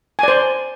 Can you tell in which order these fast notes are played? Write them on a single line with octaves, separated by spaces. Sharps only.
G#5 D5 C5